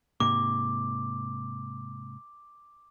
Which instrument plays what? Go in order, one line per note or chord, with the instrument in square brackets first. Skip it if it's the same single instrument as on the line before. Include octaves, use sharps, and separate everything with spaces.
[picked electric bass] G#2 C3 A#3 [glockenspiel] D6